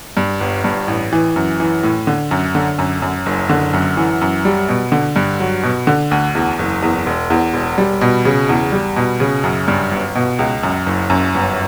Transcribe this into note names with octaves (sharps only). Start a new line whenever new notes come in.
G2
G1
G2
A1
E3
F#2
E3
A2
D3
F#2
D3
F#2
F#2
F#1
D3
F#2
E3
F#2
G3
B2
D3
G2
F#3
B2
D3
D2
E2
F#1
E2
E1
E2
E1
G3
B2
C#3
E2
G3
B2
C#3
F#2
G2
G1
B2
C#2
F#2
F#1
F#2
G1